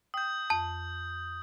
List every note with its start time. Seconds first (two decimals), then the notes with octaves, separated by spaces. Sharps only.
0.14 G5 D#6 G6
0.50 F2 A5